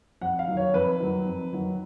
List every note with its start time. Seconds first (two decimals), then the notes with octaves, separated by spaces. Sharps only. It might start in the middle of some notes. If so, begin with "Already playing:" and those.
0.21 F2 F#5
0.39 F5
0.48 D#3 F#3
0.57 C#5
0.74 F2 B4
1.00 D#3 F#3
1.26 F2
1.53 D#3 F#3